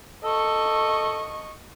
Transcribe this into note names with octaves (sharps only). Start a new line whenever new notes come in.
A4 D#5 C#6